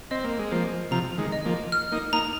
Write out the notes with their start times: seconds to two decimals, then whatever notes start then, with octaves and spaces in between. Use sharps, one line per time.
0.11 C4 D#5
0.24 A#3
0.39 G#3
0.51 F3 A#3 C5
0.91 C3 F3 A#5
1.18 D#3 G#3
1.32 D#5
1.45 F3 A#3
1.72 F6
1.92 A#3 D#4
2.13 A#3 D#4 A#5